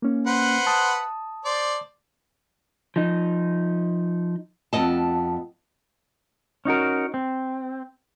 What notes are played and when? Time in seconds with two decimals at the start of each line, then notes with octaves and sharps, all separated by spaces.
0.02 A#3 C#4
0.27 B4 C5 F#5
0.67 A5 D#6
1.45 C5 D5
2.96 F3 D#4
4.73 F2 B3 D#5 A5
6.65 C#4 D#4 F#4 A#4
7.14 C4